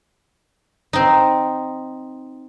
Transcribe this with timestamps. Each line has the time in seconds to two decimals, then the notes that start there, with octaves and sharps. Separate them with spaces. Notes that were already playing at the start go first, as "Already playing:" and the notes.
0.93 C4 D#4